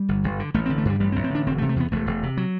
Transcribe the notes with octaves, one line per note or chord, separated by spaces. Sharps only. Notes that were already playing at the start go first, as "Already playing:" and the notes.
Already playing: G3
G1
G1
D3
A1 A3
C4
D3
A3
G2 G3
A1 G3
C4
A1
C4
D3 D4
E1 C4
A3
C3
A3
E2 B3
E1 A3
E1
C3
F#3